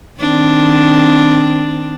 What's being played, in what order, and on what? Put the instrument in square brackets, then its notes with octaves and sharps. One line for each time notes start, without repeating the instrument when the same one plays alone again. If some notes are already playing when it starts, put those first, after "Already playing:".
[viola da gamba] D#3 C4 D4